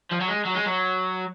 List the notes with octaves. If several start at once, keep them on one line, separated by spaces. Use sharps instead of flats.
F3
F#3
G#3
F#3
G#3
F#3